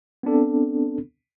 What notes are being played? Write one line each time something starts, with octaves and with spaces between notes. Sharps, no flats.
B3 C4 D4 A4